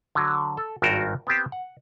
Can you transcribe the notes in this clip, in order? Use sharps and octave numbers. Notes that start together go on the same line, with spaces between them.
D3 F#3
A4
G#1 G2 F4 F#4 A#4 C5
B3 C4 G4 C5
F#5